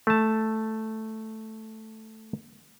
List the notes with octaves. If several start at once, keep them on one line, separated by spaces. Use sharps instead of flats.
A3 A5